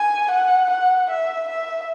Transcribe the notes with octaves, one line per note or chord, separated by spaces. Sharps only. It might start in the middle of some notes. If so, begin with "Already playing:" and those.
Already playing: G#5
F#5
F#5
E5
E5